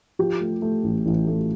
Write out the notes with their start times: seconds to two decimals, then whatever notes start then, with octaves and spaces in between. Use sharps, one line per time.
0.19 F3 G4
0.40 A3
0.62 A3
0.84 A1
1.06 A1
1.27 A3